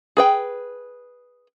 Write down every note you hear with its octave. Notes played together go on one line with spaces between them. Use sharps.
G#4 B4 G5